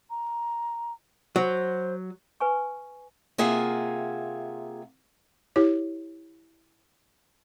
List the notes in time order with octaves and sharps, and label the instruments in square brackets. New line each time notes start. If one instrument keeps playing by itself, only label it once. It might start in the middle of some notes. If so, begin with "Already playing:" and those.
[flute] A#5
[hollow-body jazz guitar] F#3 [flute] C5
[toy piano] B4 G#5 C#6
[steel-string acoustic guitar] C3 A#3 F4 G#4 E5 F#5
[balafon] E4 G4 C#5